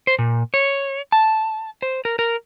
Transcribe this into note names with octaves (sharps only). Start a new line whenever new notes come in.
C5
A#2
C#5
A5
C5
A#4
A#4